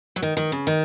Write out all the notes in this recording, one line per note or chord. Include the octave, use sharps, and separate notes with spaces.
F#3
D#3
D#3
C#3
D#3